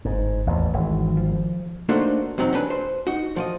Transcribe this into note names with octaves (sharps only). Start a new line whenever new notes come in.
G1 G#2
A1 E2
G#1 E3
F3
A3 A#3 D4 D#4 F#4 C5
E2 C3 F#3 C4 D#4
C#4 D4 B4
C5
D#4 F#4
F3 D5 D#5